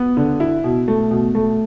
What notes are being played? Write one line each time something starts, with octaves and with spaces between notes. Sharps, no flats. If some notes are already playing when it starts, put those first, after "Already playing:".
Already playing: B3
D3
E4
B2
A3
B2
A3